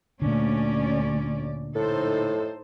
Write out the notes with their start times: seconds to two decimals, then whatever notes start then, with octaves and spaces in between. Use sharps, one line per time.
0.22 D2 A#2 D3 C#4 D5
1.76 A2 D#4 A4 C5